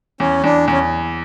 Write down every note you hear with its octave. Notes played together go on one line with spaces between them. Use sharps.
E2 C#4
E2 D4
E2 C#4